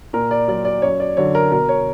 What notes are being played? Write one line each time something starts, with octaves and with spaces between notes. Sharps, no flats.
A#2 A#4
D5
F#3 D5
D5
F#2 C#5
D5
D3 F#3 C#5
A#4
B2 A#4
C#5